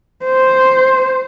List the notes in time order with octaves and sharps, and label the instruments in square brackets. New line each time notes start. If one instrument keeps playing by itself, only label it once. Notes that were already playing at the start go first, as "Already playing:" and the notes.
[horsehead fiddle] C5